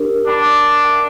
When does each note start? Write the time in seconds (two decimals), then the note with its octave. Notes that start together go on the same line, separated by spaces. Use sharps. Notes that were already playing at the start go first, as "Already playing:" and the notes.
Already playing: D4 G4 A#4
0.27 D4 A#4 C#5 G5 B5 D6
0.83 A#4 E5 G5